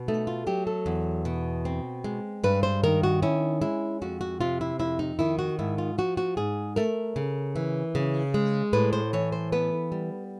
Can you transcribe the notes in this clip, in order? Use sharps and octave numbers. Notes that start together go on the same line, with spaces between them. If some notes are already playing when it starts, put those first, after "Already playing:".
Already playing: B2
A3 D#4
F4
F#3 G4
A4
E2
B2
C4
G#3
G2 B4
C5
D#3 A#4
F#4
C#4 E4
G#3 E4
F2 F#4
F#4
C3 F4
E4
F2 E4
D#4
D#3 E4
F#4
G#2 E4
F4
F3 F#4
F#4
G#2 G#4
A3 A#4
C#3
E3
C#3
G#3
A2 B4
C5
E3 C#5
C5
B3 B4
G3